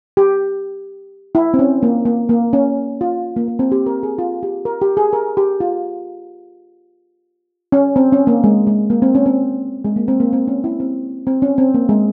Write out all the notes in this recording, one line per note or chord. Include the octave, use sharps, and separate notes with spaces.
G4
E4
C4
C#4
A#3
A#3
A#3
C#4
F4
A#3
A#3
C4
G4
A#4
G#4
F4
G4
A#4
G4
G#4
A#4
G4
F4
C#4
C4
C#4
A#3
G#3
G#3
A#3
C4
C#4
C4
G#3
A#3
C4
A#3
C4
C#4
E4
C4
C4
C#4
C4
A#3
G#3